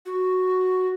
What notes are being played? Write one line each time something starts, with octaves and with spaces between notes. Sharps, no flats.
F#4